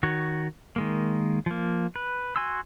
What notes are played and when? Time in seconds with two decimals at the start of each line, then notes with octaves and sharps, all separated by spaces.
0.03 D#3 F#4 C#5
0.76 D#3 G#3 A#3
1.46 F3 A#3
1.96 B4
2.36 F#4 G#5 C6 E6